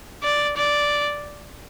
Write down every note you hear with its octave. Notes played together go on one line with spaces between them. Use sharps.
D5
D5